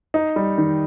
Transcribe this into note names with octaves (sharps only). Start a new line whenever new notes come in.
D#4
G3
D#3